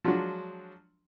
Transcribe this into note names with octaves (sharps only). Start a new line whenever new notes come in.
F3 F#3 G#3 D4 F#4